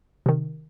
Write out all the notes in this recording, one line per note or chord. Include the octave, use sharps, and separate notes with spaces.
C3 D#3